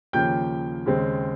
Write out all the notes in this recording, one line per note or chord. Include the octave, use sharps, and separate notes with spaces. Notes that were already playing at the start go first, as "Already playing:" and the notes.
D#2 C#3 F3 A#3 G5 G6
D#2 C#3 G#3 C4